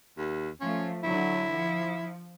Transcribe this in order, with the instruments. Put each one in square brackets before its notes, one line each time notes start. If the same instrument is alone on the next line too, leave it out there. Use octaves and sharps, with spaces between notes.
[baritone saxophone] D#2
[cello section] F3 A3 [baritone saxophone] C#4
[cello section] D3 F#3 [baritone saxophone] E4
[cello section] F3